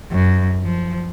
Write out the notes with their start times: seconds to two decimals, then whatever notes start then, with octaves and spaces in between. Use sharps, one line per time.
0.11 F#2
0.64 F3